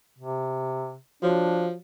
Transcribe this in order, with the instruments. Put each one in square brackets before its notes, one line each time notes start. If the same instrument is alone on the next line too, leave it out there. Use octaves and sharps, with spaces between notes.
[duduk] C3
[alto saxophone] F3 [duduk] D4 [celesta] F#4 C#5 F5